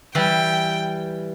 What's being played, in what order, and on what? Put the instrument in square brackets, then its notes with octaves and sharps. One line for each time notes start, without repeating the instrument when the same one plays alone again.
[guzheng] E3 G3 [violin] G5